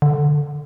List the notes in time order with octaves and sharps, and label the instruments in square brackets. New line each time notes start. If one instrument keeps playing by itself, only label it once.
[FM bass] D3